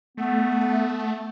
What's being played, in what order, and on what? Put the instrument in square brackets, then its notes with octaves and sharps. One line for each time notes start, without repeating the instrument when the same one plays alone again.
[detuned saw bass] A3 [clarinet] B3